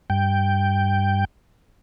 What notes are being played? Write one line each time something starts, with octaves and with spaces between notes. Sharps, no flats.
G2 G5